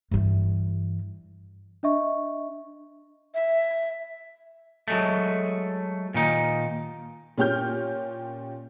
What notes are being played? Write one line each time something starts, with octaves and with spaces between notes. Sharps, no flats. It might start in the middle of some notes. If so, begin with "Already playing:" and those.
G2 E3
D4 D#5 E5 C#6
E5
F#3 G#3 A3
A#2 D#3 D#4
A#2 C#4 G4 F6 G6